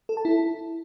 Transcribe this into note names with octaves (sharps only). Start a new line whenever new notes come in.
A4
A5
E4